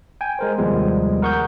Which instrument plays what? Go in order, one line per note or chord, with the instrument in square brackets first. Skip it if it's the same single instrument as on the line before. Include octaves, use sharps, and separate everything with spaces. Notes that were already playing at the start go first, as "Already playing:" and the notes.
[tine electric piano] G5 G#5
G#3 A#4 C5
D#2 C3 F3 G3 G#3 B3
A#4 F#5 C#6 D#6 G6